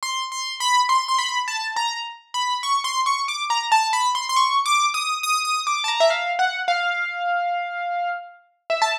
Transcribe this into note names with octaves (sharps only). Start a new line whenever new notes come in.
C6
C6
B5
C6
C6
B5
A5
A#5
B5
C#6
C6
C#6
D6
A#5
A5
B5
C6
C6
C#6
D6
D#6
D#6
D#6
D6
A5
A#5
E5
F5
F#5
F5
E5
A5